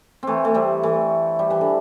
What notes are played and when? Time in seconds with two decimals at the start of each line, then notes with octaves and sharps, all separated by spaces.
0.23 E3 A3 C4
0.45 A3
0.54 G3 C4
0.83 E3 A3
1.39 G3
1.50 E3
1.61 D3